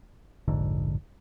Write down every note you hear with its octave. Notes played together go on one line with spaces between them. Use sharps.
F1 A#1 G#2 D3